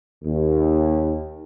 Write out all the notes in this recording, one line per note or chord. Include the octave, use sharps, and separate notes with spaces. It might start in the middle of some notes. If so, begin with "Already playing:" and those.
D#2